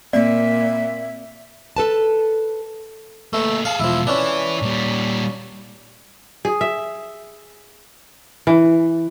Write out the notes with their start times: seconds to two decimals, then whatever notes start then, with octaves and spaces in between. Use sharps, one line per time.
0.13 A#2 A#3 C4 D5 E5
1.77 A4 B4 A5
3.33 A#2 A3 B4
3.65 G#4 A4 F5
3.80 E2 B2 F3 E4
4.07 C#4 D4 E4 B4
4.61 A#2 G3
6.45 G#4
6.61 E5
8.47 E3